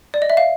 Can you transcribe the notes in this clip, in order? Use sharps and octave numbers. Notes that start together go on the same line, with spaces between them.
D5
D#5
E5
F5